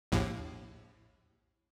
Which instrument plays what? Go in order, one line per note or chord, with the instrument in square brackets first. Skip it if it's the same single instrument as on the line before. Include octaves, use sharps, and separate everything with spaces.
[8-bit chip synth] A#1 D#2 A2